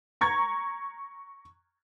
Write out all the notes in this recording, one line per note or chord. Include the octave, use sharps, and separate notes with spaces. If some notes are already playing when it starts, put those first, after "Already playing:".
A#5 C#6 G#6